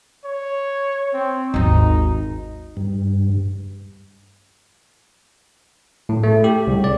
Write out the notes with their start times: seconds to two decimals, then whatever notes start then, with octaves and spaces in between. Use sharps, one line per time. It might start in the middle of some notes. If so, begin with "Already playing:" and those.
0.25 C#5
1.14 C4
1.54 G#1 D#2 D#4
2.77 G2
6.09 A2
6.23 A3
6.44 G4
6.67 C2
6.84 D5